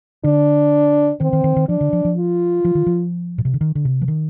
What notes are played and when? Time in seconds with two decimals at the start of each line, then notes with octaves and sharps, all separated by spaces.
0.24 D3 D4
1.20 D#3 C4
1.33 D#3
1.44 D#3
1.56 D#3
1.68 F3 D4
1.81 D3
1.93 F3
2.05 F3
2.17 F4
2.65 F3
2.75 D#3
2.86 F3
3.38 A#2
3.45 C3
3.54 D3
3.61 D#3
3.75 D3
3.85 C3
4.02 F3
4.08 D#3